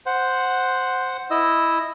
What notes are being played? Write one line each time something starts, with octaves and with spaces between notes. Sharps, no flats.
C5 F#5
E4 D#5 E6